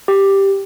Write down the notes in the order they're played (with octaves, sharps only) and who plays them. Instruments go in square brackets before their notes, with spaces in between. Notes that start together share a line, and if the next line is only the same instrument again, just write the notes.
[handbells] G4